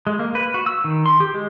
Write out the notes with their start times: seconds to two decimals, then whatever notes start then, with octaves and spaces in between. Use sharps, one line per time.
0.07 G#3
0.19 A#3
0.35 B4
0.54 F#4
0.66 E6
0.84 D#3
1.06 C6
1.20 G4
1.34 G#3